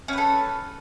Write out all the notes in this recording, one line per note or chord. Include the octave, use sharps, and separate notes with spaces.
C#4 A4 B4